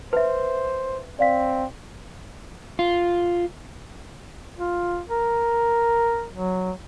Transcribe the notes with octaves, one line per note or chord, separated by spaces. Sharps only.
B4 C5 E5
C4 D5 F5 B6
F4
F4
A#4
F#3